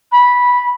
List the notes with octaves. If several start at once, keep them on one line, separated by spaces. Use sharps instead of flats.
B5